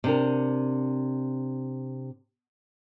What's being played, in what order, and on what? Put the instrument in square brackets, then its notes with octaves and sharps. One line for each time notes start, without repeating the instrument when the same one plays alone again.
[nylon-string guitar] C3 D4 A#4